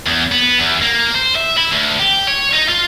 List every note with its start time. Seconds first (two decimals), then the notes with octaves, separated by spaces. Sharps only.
0.07 E2
0.32 B3
0.58 E2
0.82 A#3
1.15 C5
1.36 E5
1.58 E4
1.72 D2
1.99 G4
2.27 C#5
2.53 D#4
2.69 F4